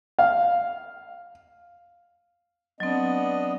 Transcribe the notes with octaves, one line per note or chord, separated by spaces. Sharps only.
F5
F#3 B3 C4 D4 D#5